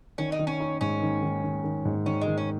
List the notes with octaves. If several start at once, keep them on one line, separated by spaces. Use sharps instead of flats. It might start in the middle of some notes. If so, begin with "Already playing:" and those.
D#3 C#4
D#4
D#3
C#4
D#4
G#2 C#4
D#3
D#3
D#3
D#3
G#2
D#3 C#4
G#3
D#3
C#4